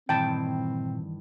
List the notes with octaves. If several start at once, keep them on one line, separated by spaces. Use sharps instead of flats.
G2 A#2 D#3 E3 C4 G5 A5